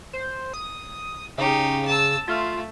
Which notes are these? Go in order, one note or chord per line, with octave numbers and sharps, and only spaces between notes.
C5
D#6
C#3 D#4 G4
A5 E6
A3 F4